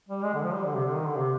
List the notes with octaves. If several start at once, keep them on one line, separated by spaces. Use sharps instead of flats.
G3
G#3
D3
F3
G3
D3
C3
D3
D#3
D3
C3